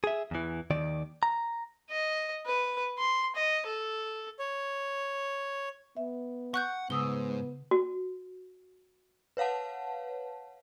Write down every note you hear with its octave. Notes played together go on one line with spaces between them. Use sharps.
G#4 E5
E2 E3
D#2 D#3 D5
A#5
D#5
B4
C6
D#5
A4
C#5
B3 E5
F#5 C#6 F#6 G6
G#2 C#3 B3 D#6 E6 G7
F#4
B4 C#5 F5 F#5 A5